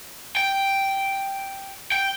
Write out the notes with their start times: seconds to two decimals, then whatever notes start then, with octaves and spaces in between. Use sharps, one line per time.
0.37 G5
1.92 G5